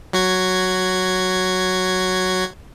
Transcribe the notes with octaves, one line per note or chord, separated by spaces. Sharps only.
F#3 F#4 G#6